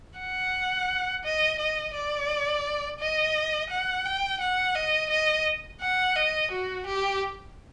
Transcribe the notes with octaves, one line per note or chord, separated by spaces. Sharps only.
F#5
D#5
D#5
D5
D#5
F#5
G5
F#5
D#5
D#5
F#5
D#5
F#4
G4